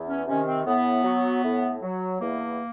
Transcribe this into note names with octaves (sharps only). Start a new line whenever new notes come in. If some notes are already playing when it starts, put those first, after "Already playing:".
Already playing: E2
C#4
C3 D#3 C#4
C4
A2 B3
F#3
A2
F#3
E2 A#3